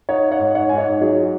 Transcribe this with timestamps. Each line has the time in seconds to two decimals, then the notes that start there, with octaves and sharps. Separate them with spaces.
0.09 D#4 C#5 F#5
0.32 C#5 F#5
0.39 G#2
0.55 C#5 F#5
0.69 G#2 G#5
0.78 C#5 F#5
1.01 F#3 G#4 C#5